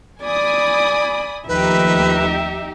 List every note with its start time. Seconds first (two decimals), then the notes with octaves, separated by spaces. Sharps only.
0.23 D5 G#5 B5 D#6
1.48 D#2 F3 A3 D#4 G4 B4 E5